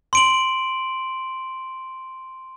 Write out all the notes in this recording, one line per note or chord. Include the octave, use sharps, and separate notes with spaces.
C6 D7 F#7